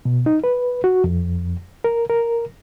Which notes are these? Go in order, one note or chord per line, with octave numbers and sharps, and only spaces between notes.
B2
D#4
B4
F#4
F2
A#4
A#4